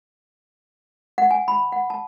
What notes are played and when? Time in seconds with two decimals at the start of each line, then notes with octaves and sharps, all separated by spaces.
1.18 F#5
1.31 G#5
1.48 B5
1.72 F#5
1.90 A5